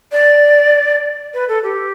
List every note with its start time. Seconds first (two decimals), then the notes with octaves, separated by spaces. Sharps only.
0.12 D5
1.34 B4
1.49 A4
1.63 G4